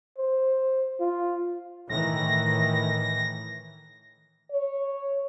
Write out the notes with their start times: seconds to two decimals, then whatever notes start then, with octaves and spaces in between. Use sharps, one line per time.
0.18 C5
1.00 F4
1.89 A2 D#3 E3 A#6
4.51 C#5